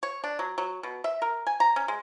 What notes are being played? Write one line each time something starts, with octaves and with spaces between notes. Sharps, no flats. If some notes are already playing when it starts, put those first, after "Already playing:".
C#5
D4
F#3
F#3
B2
E5
A#4
G#5
A#5
C#4
G#3